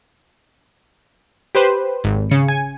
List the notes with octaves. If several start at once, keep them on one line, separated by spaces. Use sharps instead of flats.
G4 B4 C5
G#1
C#3 C#7
G#5